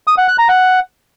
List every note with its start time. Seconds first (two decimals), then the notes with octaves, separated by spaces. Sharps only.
0.07 D#6
0.18 F#5
0.28 F#6
0.38 A#5
0.49 F#5